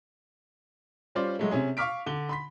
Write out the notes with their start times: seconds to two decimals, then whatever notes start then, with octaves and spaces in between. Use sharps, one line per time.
1.15 G3 C#4 F4 C5 D5
1.39 F#3 G#3 A3
1.51 C3 C#4 G#4
1.77 F5 C#6 D6 F6 B6 D7
2.06 D3 G7
2.29 B5 C6 B6